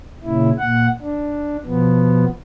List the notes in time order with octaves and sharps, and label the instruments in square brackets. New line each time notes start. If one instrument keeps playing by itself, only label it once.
[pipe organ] A#2 C#3 E4
A#2 F#5
D4
B2 F3 B3